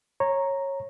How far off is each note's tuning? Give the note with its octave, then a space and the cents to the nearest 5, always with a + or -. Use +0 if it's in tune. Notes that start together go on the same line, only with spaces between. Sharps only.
C#5 -15 A#5 +0